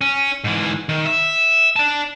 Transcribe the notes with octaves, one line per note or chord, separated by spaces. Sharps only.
C#4
G#2 E3
D#3
E5
D5 A5